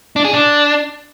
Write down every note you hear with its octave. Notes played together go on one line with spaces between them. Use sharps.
D4
G#4
D4